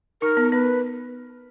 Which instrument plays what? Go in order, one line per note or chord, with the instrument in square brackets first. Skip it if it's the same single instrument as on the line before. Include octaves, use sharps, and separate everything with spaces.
[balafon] D#4 [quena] A#4
[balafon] B3
[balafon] B3 [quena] B4